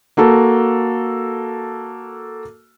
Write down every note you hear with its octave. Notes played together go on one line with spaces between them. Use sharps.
A#3 F#4 A4